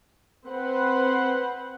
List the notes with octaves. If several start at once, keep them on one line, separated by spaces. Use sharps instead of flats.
C4 B4 C5 F#5